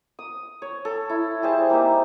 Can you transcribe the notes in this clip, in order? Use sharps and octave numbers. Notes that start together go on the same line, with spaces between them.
D#6
C#5
A4
E4
G3 G#4 C5 A5
A#3 C4 D#4 G4